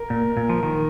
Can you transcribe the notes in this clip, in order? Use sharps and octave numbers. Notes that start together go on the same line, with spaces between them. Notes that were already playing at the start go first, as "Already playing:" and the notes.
Already playing: A#4
A#2
A#2
F3
D#3